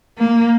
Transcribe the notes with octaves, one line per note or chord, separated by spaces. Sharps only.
A#3